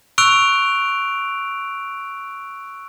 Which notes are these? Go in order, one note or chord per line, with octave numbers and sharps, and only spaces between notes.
C#6 E6 F#6 D7 F7